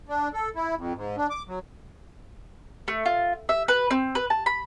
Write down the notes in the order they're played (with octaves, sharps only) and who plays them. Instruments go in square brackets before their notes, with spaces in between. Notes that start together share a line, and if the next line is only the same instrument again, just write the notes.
[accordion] D4
A4
E4
F2
G#2
D4
D6
F#3
[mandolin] A3
F4
E5
B4
C4
B4
A5
B5